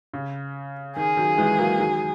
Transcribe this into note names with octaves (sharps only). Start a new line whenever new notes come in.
C#3
D#3 G#4
D#3 F#3
E3 G#3
F#3 A#3
D#3 F#3